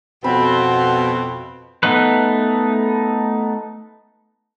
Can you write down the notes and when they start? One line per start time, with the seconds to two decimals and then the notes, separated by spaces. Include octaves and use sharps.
0.24 F2 B2 C4 B5
1.83 A3 B3 D#4 B4